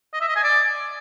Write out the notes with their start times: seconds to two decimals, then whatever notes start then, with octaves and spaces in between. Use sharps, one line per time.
0.13 D#5
0.21 E5
0.28 D#5
0.36 G#5
0.44 D5